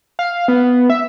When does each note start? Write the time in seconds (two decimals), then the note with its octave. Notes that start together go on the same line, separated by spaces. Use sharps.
0.19 F5
0.48 B3
0.90 E5